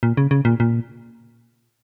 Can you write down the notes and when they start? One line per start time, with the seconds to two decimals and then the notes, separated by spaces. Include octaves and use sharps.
0.03 A#2
0.17 C#3
0.31 C#3
0.45 A#2
0.60 A#2